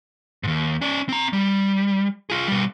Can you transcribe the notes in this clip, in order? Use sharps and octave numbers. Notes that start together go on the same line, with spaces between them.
D#2 G#2
C#4 D5
C4 A#5
G3
F4 G#4
B2 G3